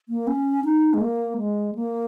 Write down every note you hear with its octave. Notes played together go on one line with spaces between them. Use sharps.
A#3
C#4
D#4
G#3
A#3
G#3
A#3